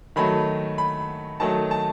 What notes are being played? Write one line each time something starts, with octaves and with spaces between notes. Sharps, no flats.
D#3 F#3 A3 B5
B5
D#3 F#3 A3 A5
A5